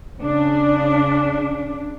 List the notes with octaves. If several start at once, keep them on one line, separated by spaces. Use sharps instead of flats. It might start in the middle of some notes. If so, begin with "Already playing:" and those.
C#3 D4